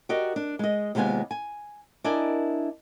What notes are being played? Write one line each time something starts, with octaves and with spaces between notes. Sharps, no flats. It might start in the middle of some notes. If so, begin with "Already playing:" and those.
F#4 G4 A#4 D5 D#5
D4
G#3 D#5
D#2 C3 G#3 B3 F4 G#5
G#5
D4 E4 A#4 D5 D#5 G#5